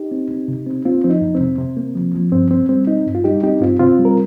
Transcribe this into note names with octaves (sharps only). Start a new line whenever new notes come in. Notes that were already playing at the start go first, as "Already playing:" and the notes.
Already playing: D#4 G4
C4
C4
C3
C4
A#3 C4 F4
F3 C4
D#4
F2
C4
C3
C3
A#3
F3
F3
G2 C4
C4
G3 C4
C4 D#4
G2
F4
G3 D#4 G4
C4 D#4 G4
G2 C4 F4
C3 C4 F4
G3
A#4